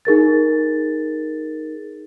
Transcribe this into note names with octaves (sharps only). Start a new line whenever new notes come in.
D#4 G#4 A#4 A6